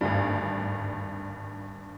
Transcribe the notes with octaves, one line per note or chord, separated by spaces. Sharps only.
G#1 D2 G2